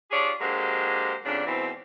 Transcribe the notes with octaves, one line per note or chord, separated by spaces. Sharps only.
D4 F4 G4 G#4 C#5 D5
D3 F#3 G#3 A#3 G4 C5
F2 G#2 C#3 D4
G#2 B2 E3 C4